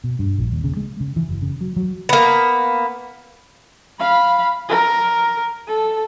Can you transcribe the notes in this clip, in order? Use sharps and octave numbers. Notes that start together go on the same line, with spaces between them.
B2
G2
A#1
D#2
C#3
G#3
C#3
E3
F#1
C#3
F#3
F#3
A#3 B3
F5 B5
A#4
A4